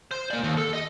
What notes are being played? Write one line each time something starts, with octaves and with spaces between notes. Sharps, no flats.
C5
A#3 D5
D#2
A4
D#5